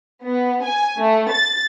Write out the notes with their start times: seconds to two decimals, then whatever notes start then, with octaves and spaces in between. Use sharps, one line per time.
0.25 B3
0.63 G#5
0.99 A3
1.31 A6